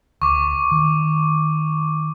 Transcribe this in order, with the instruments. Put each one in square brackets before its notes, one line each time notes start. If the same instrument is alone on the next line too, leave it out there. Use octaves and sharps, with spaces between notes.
[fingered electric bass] D2 [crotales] C#6 D6
[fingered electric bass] D#3